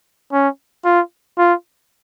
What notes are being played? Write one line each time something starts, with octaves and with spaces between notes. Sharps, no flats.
C#4
F4
F4